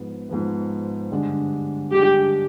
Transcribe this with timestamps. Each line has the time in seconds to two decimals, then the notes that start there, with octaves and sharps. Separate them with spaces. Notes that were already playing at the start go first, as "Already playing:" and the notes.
Already playing: G#2 F3 B3
0.29 G#2 F3 B3
1.11 G2 D3 G#3 D4
1.92 G2 D3 G#3 D4 G4